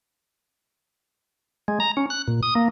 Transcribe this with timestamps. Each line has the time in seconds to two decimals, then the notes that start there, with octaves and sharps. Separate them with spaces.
1.68 G#3
1.80 A#5
1.97 C#4
2.10 F#6
2.28 A#2
2.43 D#6
2.55 A#3